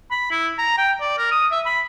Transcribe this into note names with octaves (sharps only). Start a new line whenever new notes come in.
B5
E4
A#5
G5
D5
A#4
D#6
E5
B5